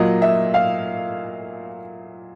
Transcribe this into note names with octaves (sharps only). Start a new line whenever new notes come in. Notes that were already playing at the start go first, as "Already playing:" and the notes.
Already playing: A#2 F#3 A#3 D#5
E5
F5